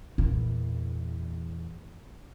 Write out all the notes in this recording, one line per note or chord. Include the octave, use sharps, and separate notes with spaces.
E2 A#2